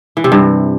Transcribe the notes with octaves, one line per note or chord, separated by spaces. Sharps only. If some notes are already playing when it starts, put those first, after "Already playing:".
E3
C3
G2